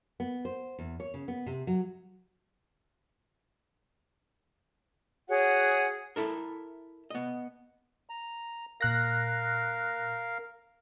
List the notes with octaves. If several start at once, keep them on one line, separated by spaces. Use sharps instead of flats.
B3
C5
E2
C#5
C#3
B3
C3
F#3
F#4 G#4 C#5 F#5
E4 A4 A#4
B3 D#5
A#5
A#2 A#4 F5 F#6 A#6